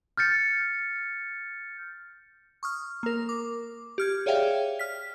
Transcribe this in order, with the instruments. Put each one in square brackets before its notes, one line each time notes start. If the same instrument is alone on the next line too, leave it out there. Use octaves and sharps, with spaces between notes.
[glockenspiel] F6 G6 A6 C#7
[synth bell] C#6 D#6 F6
A#3 A#4
D6
G4 F6 G#6
G#4 C#5 D5 E5 F5 G5
F6 B6